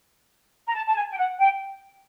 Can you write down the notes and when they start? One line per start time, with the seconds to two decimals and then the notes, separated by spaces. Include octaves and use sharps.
0.67 A#5
0.74 A5
0.87 A5
0.95 G#5
1.11 G5
1.17 F#5
1.38 G5